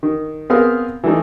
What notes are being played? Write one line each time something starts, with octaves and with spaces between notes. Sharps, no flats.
D#3
B3 C4 G#4 A#4 F5
E3 G3 A3 D#4